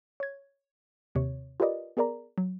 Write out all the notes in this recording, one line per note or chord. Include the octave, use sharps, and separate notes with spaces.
C#5 G#6
D#2 C3 C#5
F4 G4 A#4 B4 D5 D#5
B3 G#4 A#4 D5 A#5
F#3